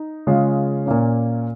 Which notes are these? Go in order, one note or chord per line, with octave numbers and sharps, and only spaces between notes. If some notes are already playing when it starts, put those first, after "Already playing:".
Already playing: D#4
C#3 G#3 F4
A#2 A#3 C#4